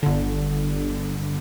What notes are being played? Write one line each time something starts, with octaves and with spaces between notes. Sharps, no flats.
G1 D3